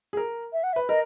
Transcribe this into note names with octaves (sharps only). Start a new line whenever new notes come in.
G#4
A#4
E5
F#5
E5
B4
A#4 D#5